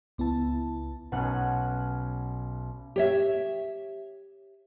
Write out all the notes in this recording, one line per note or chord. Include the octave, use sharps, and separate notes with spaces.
C#2 B3 E4 A5
B1 B2 C#4 F#5 F6 F#6
G4 C#5 E5